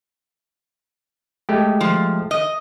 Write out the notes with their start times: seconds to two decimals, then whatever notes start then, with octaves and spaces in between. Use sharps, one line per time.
1.49 G#3 A3 G4
1.81 F3
2.31 D#5